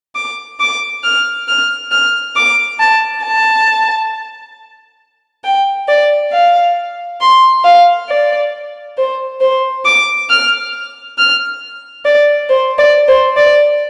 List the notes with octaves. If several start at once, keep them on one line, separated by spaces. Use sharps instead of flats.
D6
D6
F6
F6
F6
D6
A5
A5
G5
D5
F5
C6
F5
D5
C5
C5
D6
F6
F6
D5
C5
D5
C5
D5